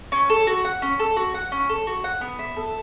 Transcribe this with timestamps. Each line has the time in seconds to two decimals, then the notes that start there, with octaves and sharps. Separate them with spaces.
0.12 C#4
0.30 A4
0.47 F#4
0.65 F#5
0.82 C#4
0.99 A4
1.16 F#4
1.34 F#5
1.52 C#4
1.69 A4
1.87 F#4
2.04 F#5
2.21 B3
2.39 E5
2.56 A4